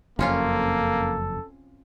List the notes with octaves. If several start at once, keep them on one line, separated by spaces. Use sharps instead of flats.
F#1 F2 A#3 C4 C#4 F4 A4